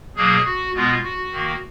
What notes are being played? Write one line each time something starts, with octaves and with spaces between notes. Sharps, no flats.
B2 F#3 A#3 G#4
F#4
B2 G#3 B3 F4
F#4
D#3 A#3